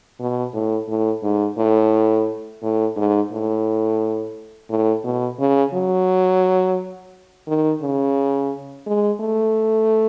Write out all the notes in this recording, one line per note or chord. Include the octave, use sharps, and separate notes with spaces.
B2
A2
A2
G#2
A2
A2
G#2
A2
A2
B2
C#3
F#3
D#3
C#3
G#3
A3